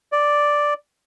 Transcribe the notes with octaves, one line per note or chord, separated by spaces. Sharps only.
D5